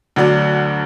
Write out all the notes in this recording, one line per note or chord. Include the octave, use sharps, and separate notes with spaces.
D2 D3 F#3 D4